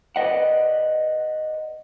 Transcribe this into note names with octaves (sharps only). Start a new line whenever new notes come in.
B4 D5 D#5 F#5